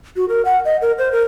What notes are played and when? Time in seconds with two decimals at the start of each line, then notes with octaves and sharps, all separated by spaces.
0.16 F#4
0.29 A#4
0.45 F#5
0.65 D#5
0.82 A#4
0.98 C5
1.12 A#4